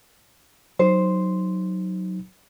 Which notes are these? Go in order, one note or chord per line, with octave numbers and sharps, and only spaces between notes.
F#3 D#4 C5